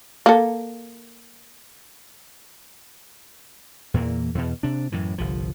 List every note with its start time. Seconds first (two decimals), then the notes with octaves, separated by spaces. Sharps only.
0.26 A#3 A4
3.94 E2 A#2 E3 A#3
4.35 E2 B2
4.63 C3 D4
4.92 F#2 A2 E3
5.18 G1 C2 F3